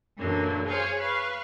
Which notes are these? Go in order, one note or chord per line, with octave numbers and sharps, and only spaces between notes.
F#2 A#2 D3 E3 F#3 A#3
G#4 C5 C#5 F5 G#5
B4 F5 B5 C#6